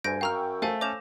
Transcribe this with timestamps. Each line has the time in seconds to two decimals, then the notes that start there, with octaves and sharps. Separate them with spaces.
0.04 D2 G2 G#5 G6 A#6 D7
0.21 F#2 F5 G5 A#5 C#6 E6 F6
0.62 A3 C5 E5 F5 G#5
0.81 C#4 D6 G6 A#6 E7 F7